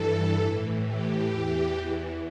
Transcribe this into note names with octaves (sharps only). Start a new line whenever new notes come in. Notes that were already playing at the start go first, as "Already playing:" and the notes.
Already playing: G2 E3 A4
A2 E3
G4
E2 E3